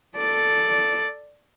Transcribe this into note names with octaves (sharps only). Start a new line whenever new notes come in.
A4 D5